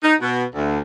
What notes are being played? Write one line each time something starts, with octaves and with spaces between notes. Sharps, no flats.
D#4
B2
D2